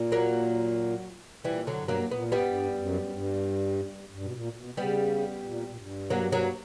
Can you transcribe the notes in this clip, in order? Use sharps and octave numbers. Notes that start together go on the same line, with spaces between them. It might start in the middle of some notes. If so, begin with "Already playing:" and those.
Already playing: A#2
F#3 A#3
A#2 E3 G3
D3 F#3
G2
F#3 A#3
A#2 B3
F#2 G3 B3
G2
F#2
F#2
G2
G2
B2
A#2
B2
C#3 G3 B3
A#2
A#2
G2
F#3 A#3
F#3 A#3